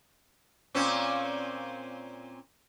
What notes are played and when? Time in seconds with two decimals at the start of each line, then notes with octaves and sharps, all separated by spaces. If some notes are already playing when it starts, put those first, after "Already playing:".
0.74 A#2 C4 C#4